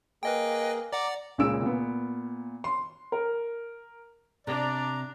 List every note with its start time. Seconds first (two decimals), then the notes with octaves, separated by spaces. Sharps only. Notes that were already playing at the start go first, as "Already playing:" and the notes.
0.23 A#3 G#4 B4 D#5 G5
0.93 D5 F#5 A#5 D6
1.38 C#2 A#2 C#3 G#3 E6 D7
1.62 A#2 B3
2.64 C6
3.12 A#4
4.47 C3 D4 D5 A#5